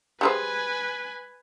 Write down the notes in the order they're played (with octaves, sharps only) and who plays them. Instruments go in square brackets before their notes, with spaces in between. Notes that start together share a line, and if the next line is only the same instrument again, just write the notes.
[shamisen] G3 G#4 C5 [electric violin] B4 G#5